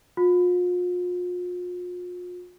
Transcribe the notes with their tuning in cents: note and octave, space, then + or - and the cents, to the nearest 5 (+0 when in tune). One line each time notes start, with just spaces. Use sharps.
F4 +40